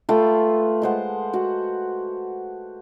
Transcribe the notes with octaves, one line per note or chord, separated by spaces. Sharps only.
A3 F4 B4 G5
G#3 C5 F#5
F#4